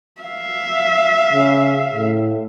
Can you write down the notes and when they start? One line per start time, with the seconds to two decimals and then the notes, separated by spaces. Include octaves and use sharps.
0.21 E5 F5
1.33 C#3
1.95 A2